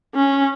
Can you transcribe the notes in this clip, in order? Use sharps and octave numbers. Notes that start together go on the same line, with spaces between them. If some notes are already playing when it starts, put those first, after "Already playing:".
C#4